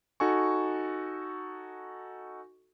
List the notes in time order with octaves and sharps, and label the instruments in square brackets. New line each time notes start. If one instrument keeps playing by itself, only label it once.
[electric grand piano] D#4 F#4 A4 G#5 C#6